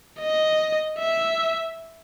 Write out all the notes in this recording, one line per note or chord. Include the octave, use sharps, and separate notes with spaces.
D#5
E5